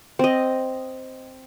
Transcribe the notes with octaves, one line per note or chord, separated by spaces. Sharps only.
C4 D#5